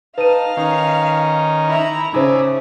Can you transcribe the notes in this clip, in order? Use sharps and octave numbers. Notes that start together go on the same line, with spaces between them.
D#4 B4 F5 A5 D#7
D#3 C#4 D#4
E4 A#5
C#3 D#4 G#4 C5 D5 E5